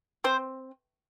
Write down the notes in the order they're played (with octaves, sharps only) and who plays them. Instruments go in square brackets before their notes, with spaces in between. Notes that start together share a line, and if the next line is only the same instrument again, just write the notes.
[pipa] C4 C5